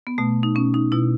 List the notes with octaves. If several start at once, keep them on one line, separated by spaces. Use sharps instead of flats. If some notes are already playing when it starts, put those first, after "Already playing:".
B3
B2 A3
D#4
B2 C#4
D#4
B2 E4